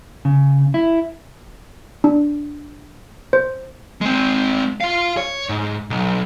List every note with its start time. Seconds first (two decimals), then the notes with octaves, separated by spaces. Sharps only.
0.25 C#3
0.74 E4
2.04 D4
3.33 C5
4.01 G#3 C4
4.81 F4 F5
5.17 C#5
5.49 G#2
5.90 B1